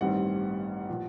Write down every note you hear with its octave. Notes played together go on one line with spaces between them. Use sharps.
A1 G2 D#3 G3 C4 F#5
A#2 F3